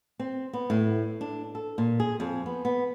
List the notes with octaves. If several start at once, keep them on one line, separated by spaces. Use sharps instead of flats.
C4
B3
A2
D4
A4
A#2
G#4
F2
B3
B3